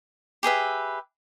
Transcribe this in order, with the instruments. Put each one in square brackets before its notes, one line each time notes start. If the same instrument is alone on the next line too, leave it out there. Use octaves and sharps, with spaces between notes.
[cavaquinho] G4 G#4 B4 E5